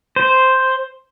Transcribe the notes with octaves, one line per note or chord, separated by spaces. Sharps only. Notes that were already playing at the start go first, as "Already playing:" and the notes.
C5